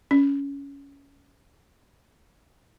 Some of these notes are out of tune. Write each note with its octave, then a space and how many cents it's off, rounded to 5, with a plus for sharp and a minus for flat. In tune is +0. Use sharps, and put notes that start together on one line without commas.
C#4 +15